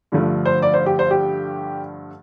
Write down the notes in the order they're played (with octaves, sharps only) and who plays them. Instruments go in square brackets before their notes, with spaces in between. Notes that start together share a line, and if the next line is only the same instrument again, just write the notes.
[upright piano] G2 D3 F3 A3
C5
D5
C5
G4
C5
G4